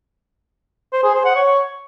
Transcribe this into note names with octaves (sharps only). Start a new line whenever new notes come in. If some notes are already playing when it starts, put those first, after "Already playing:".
C5
G#4
C5
F#5
C#5